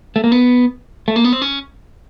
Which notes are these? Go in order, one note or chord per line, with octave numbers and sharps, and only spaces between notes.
A3
A#3
B3
A3
A#3
B3
C4
C#4